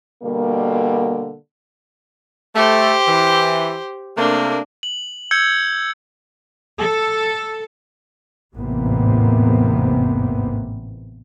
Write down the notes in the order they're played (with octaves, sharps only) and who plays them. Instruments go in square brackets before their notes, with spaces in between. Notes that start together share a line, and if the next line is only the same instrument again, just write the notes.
[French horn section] B2 D3 G3 A#3
[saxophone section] A3 [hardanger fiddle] G4 C5
[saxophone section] E3
[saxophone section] C3 A3 A#3 [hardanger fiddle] D4
[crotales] F#7
E6 G6 G#6 C#7 G7
[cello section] A4
[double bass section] A1 E2 G#2 C3 A#3 B3